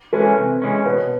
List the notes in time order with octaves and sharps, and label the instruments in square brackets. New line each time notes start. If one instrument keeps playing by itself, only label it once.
[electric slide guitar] E3 G#3 C#4 [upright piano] A4 B4
[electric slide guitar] C3
E3 G#3 C#4
[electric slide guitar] B2 [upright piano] B4 C#5